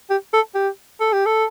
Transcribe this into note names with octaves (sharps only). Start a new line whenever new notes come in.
G4
A4
G4
A4
G4
A4